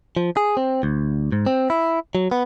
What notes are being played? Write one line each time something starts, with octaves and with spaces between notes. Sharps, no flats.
F3
G#4
C4
D2
G#2
C4
E4
F#3
B3